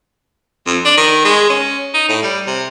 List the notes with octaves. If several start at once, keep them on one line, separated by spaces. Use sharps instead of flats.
F2
D4
D#3
G#3
C#4
D#4
A2
G3
C3